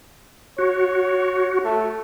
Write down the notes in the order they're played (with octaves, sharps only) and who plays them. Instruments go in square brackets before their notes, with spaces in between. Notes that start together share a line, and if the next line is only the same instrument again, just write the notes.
[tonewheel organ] F#4 [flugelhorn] C#5
[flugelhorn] A3